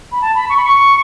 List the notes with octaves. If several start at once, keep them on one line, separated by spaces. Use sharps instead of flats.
B5
A5
B5
C#6
B5
C#6